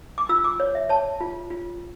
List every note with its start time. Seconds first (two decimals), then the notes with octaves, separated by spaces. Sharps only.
0.18 D6
0.29 F4 E6
0.44 D6
0.60 C#5
0.75 E5
0.89 C#5 A5
1.21 F4
1.50 F4